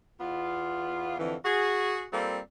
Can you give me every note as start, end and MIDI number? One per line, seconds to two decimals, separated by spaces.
0.20 1.18 40
0.20 1.18 59
0.20 1.18 65
1.19 1.35 41
1.19 1.35 50
1.19 1.35 52
1.45 2.05 66
1.45 2.05 68
2.13 2.39 55
2.13 2.39 58
2.13 2.39 60
2.13 2.39 65
2.13 2.39 69